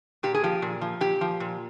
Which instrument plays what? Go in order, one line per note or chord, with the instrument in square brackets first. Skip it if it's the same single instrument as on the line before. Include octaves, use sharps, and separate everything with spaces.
[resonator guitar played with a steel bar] A#2 G4
G#4
F3 G4
A#2
F3
A#2 G4
F3
A#2